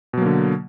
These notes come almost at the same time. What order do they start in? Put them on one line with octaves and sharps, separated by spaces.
B2 F#3 A#3 D3